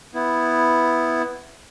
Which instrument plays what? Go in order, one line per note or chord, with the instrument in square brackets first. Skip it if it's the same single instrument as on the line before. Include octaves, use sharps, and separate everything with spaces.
[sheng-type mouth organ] B3 E4